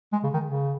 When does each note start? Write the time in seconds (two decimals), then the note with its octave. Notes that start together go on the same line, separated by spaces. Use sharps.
0.12 G#3
0.23 C#3
0.34 D#3
0.45 C#3